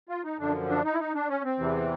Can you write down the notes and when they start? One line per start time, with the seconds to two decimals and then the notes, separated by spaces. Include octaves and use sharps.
0.09 F4
0.24 D#4
0.39 F#2 D3 F3 D4
0.69 D4
0.84 D#4
0.94 E4
0.99 D#4
1.15 D4
1.29 C#4
1.44 C4
1.59 E2 C3 E3